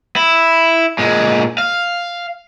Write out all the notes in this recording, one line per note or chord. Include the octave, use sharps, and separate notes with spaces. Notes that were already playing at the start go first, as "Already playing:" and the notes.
E4
A#2 G#3
F5